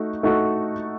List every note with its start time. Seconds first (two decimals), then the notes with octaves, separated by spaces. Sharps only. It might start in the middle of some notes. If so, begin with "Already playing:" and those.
Already playing: A3 D#4 F#4
0.23 A3 D#4 F#4 A4